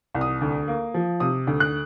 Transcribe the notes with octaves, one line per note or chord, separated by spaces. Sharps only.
C2
D#6
D2
A#3
F3
C3 D#6
D2
F#6